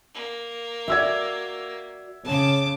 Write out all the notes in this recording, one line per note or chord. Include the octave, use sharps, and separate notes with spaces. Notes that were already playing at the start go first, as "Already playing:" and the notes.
A#3
F#4 D5 E5 E6 G#6
C#3 A5 D6